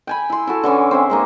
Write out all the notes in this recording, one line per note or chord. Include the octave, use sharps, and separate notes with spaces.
G5 G#5 B5
E4 C6
E4 F#4 A4
D3 E3 C#4 G#5
C4 C5 E5
G#3 A#3 D#4